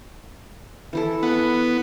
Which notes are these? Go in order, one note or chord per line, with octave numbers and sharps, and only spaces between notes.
E3 E4 A4
B3 F#5